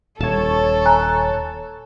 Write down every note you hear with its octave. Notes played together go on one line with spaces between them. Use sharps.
D#1 A4 C#5 A5
G#5 A#5 F#6